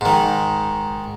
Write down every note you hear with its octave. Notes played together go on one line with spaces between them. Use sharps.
G#2 D#3